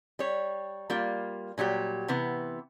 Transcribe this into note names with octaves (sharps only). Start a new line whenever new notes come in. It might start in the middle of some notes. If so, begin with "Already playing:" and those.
G3 C#5
G3 A#3 F4
A#2 F#3 G3 G4
C3 E3 B3